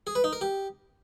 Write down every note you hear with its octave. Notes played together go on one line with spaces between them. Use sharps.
G#4
B4
D#4
A#4
G4